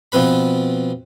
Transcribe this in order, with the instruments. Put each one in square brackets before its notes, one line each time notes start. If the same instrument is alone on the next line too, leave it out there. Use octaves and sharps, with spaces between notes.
[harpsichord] B2 F3 C4 B4 B5